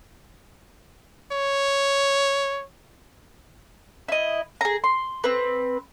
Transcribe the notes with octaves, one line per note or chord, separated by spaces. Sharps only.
C#5
E4 D#5
G#4 A#5
C6
C4 B4